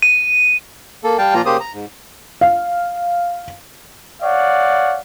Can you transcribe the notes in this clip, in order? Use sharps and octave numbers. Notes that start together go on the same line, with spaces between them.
D#7
A#3 A4
G3 F5 G5 A5
A#2 F3 A#3 F4 A#5
C#3 A#3 G4 C5 D#6
A#5
G#2
F5
C#5 D5 F5 F#5